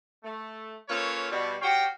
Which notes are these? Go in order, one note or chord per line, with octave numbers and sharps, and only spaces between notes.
A3
A#3 C#4 F4 A4 B4 C#5
B2 G3
F#4 G4 C#5 F5 G5